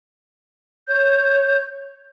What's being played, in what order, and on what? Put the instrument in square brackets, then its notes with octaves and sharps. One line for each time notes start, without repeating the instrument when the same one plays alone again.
[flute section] C#5 G6